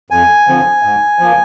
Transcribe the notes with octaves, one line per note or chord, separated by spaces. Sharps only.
F2 G#5
D3 F3 C4
G#2
F3 A#3